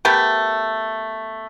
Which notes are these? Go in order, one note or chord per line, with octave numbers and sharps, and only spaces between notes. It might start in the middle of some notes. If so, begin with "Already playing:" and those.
A3 B3 G4 A#4